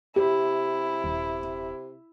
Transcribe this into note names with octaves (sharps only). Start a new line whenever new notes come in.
C3 E4 G4
D#1